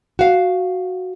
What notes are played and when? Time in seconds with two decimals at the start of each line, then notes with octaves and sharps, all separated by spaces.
0.19 F#4 F5